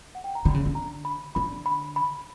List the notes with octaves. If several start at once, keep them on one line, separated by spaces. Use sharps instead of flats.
F#5
G5
A#5
D3 B5
C#3
D3
A#5
B5
D3 B5
B5
B5